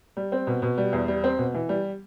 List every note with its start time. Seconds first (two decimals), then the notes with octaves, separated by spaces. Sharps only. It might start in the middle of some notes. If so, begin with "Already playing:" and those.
0.17 G3
0.32 C4
0.47 B2
0.62 B2
0.78 G3
0.93 E2
1.08 G3
1.24 C4
1.38 B2
1.54 E3
1.69 G3